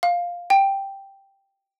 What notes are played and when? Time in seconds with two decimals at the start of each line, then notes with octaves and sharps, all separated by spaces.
0.03 F5
0.50 G5